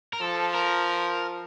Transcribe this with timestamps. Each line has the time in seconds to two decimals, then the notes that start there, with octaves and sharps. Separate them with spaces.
0.13 A#4
0.21 F3 A4
0.55 A#4